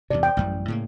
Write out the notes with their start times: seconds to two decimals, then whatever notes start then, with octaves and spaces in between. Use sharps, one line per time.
0.11 E2 G2 C3 D5
0.23 G5
0.37 A1 F#2 G3
0.68 A2 C#3 A#3